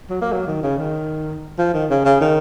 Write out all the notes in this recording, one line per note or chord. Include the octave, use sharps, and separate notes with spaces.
F#3
A#3
F#3
D#3
C#3
D#3
F3
D#3
C#3
C#3
D#3